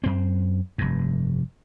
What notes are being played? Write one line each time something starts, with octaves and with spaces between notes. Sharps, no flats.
F#2 C4
F1 G2